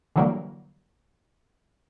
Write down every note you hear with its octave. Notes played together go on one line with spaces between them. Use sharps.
D3 E3 F#3 G3 A#3